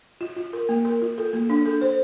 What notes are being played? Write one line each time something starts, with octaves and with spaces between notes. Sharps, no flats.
F4
F4
A#4
A#3
A#4
F4
A4
A#3
D4
A4
C5